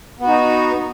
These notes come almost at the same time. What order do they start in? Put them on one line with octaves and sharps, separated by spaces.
B3 F#4 D#4